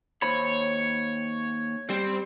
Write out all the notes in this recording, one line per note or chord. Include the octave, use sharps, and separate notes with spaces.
D#2 C5 C#5 B5
G3 C4